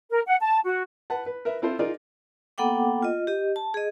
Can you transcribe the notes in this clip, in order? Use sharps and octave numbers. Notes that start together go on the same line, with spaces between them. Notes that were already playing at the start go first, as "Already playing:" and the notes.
A#4
F#5
A5
F#4
B4 F#5 A5
B4
A#4 B4 E5
C4 E4 F4 A4 C5
D#4 F4 G#4 A#4 D5
A#3 B3 A4 F#5 G5 D6
F4 D#5
G4 D#5
A5
G#4 D#5